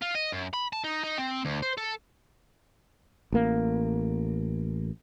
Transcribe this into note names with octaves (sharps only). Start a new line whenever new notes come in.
F4
D#5
F#2
B5
A5
D#4
D#4
C4
D2
C5
A4
A1 A#3